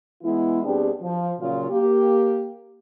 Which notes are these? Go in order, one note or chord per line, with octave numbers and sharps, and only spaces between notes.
E3 G#3 B3 E4
B2 G3 C4 D4 G4 G#4
F3
A#2 C#3 F#3 F4
A#3 G4